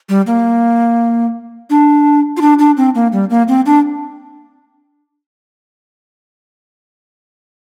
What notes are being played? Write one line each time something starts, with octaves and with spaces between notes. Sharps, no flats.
G3
A#3
D4
F4
D4
D4
C4
A#3
G3
A#3
C4
D4